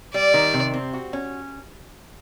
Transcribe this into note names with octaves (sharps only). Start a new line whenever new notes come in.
G3 D5
D#3
C3
C4
F#4
C#4